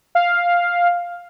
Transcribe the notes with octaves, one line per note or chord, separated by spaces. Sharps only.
F5